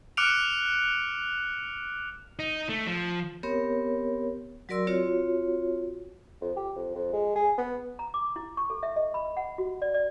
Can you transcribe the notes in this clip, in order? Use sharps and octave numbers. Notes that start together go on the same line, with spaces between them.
D6 F6 F#6 C#7 D7 F7
D#4
A3
F3
B3 C4 G4 A#4 C#5
F#3 F#4 A#4 D5 C6 E6
C4 F4 F#4 C#5
F2
G4
F2
F2
G#3
G#4
B3
A#5
D6
E4
C#6
A4
E5
D#5
B5
F#5
F#4
D5
D5